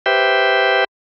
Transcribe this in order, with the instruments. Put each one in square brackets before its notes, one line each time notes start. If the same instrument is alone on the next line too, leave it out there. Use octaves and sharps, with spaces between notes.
[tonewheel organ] G4 B4 C5 E5 G5